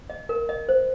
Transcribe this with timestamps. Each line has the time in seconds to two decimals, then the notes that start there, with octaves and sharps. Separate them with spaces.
0.10 D#5
0.29 A#4
0.49 D#5
0.69 C5